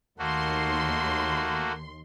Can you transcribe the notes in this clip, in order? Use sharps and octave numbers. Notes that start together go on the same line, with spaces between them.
D#2 A3 A#3 F#4 C6